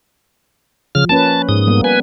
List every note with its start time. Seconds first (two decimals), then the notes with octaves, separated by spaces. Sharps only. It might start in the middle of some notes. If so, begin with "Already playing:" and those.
0.95 C#3 F3 F6
1.09 A#3 C#4 B4 A5
1.49 G#2 D#6
1.67 G3 A#3 B3
1.84 B4 G#5